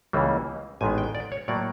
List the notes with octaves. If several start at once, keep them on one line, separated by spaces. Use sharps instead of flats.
C#2 C#3 E3 G3 A#3
A1 G#2 D#3 G#3 B3 G#5
G5
D5
C#5
A2 F#3 A#3 D5